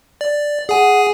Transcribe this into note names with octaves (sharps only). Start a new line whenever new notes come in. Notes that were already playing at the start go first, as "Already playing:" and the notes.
D5
G#4 F#5 G#5